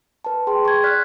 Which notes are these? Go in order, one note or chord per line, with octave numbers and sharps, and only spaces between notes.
B4 A5
G#4 G5 C6
C#6 G#6
D5 F6 F#6 B6